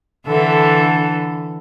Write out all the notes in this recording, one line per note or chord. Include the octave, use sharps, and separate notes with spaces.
D3 E3 A4